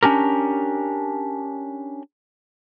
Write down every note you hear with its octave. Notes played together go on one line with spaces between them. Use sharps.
C#4 D4 G4 A#4